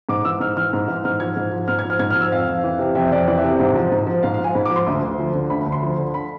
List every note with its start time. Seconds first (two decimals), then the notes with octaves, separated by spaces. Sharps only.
0.09 G#2 D6
0.25 E3 E6
0.40 G#2 F6
0.56 E3 F6
0.73 G#2
0.88 E3
1.05 G#2 F6
1.20 F3 G#6
1.36 G#2
1.52 F3
1.68 G#2 F6
1.79 G#6
1.84 F3
1.90 F6
1.99 G#2 G#6
2.10 F6
2.15 F3
2.21 E6
2.32 F2 F5
2.47 F2
2.64 E3
2.79 C3
2.95 F2 E5
3.11 F2 D5
3.27 E3 D5
3.37 E5
3.44 C3
3.60 G#2
3.75 F3
3.92 G#2
4.07 F3
4.23 G#2 F5
4.34 F5
4.39 F3
4.44 G#5
4.55 G#2 B5
4.65 D6
4.70 F3
4.76 C6
4.87 D2
5.02 D2
5.19 F3
5.35 D3
5.50 D2 B5
5.61 B5
5.66 D2
5.72 C6
5.83 F3
5.98 D3
6.14 B5